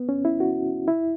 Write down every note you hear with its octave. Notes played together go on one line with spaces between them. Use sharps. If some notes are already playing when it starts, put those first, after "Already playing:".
Already playing: B3
C#4
E4
F#4
E4